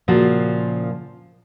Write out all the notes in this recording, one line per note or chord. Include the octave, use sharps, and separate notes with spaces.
A#2 C#3 F3 F#4